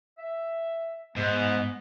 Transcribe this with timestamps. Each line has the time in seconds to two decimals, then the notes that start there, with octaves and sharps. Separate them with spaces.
0.18 E5
1.16 G#2 B3